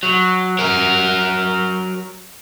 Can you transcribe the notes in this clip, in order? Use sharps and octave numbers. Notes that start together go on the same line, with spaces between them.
F#3
F#3 A#4